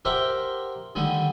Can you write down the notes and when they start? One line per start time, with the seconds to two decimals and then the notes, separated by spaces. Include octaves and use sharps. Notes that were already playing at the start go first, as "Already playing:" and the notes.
0.05 G4 A#4 C5 E5 F#5 G5
0.95 D3 D#3 G3 A3